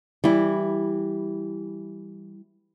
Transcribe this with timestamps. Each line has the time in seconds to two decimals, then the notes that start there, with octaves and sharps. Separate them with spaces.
0.24 E3 G3 E4